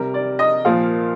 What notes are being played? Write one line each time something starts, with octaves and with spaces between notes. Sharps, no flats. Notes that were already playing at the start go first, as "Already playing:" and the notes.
Already playing: C3 G3 A#4
D5
D#5
A#2 F3 F5